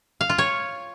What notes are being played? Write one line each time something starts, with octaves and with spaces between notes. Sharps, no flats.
F5
F4
C#5